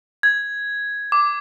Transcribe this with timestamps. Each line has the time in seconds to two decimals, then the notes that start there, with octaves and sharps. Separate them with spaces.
0.23 G#6
1.12 D6